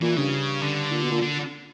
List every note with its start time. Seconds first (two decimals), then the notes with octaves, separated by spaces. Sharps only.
0.02 A#2 E3
0.17 G2 C#3
0.62 D3
0.92 A#2
1.02 B2
1.12 A#2
1.21 D3